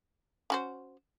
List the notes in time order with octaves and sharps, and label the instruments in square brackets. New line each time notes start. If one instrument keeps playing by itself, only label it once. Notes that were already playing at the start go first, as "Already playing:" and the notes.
[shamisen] C#4 F#4 C5